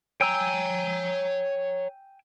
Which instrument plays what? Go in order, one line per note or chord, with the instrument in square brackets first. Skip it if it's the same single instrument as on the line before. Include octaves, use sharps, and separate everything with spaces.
[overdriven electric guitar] C#5 A#5 [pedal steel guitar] G5 G#5 E6